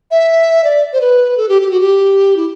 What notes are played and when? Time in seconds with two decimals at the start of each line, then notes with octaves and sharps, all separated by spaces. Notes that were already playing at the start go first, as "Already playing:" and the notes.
0.11 E5
0.64 D5
0.93 C5
1.01 B4
1.37 A4
1.49 G4
1.62 G4
1.71 F#4
1.80 G4
2.37 E4